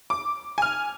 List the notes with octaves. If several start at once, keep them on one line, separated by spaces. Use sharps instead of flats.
D6
G#5 F6